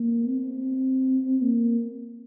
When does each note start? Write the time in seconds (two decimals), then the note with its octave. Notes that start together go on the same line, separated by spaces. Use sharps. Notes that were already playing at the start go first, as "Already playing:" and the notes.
Already playing: A#3
0.28 C4
1.42 A#3